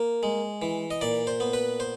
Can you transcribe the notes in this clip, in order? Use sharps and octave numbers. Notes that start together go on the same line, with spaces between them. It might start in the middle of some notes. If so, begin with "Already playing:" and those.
Already playing: A#3
G#3
E3
D#5
A#2 D5
C5
B3
B4
C5